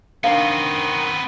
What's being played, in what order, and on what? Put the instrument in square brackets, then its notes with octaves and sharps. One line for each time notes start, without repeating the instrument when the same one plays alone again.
[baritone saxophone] D#3 [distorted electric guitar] B3 C4 [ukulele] D4 F5